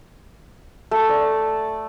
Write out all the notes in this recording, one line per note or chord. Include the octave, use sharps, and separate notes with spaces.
A3
D5